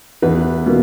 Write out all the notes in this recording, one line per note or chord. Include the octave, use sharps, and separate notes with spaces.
E2 B4
B2 A#3